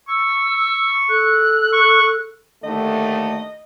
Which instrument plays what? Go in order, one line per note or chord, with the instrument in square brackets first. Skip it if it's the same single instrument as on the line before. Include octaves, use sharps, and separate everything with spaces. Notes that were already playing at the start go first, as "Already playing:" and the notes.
[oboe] C#6 [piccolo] E6
[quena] A4 [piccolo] F#6
[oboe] C#6
[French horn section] D#2 D3 A3 [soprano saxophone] D#5